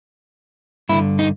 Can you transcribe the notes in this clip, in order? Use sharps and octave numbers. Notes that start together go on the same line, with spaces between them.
G2 D3 E4
D#4